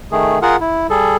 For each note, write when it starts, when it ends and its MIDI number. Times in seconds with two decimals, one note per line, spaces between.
0.12 0.39 51
0.12 0.39 57
0.12 0.39 68
0.42 0.56 65
0.42 0.56 68
0.42 0.56 70
0.42 0.56 78
0.61 0.87 64
0.90 1.17 55
0.90 1.17 68
0.90 1.17 69